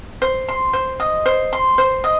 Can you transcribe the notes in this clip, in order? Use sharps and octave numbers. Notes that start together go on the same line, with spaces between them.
C5
C6
C5
D#5
C5
C6
C5
D#5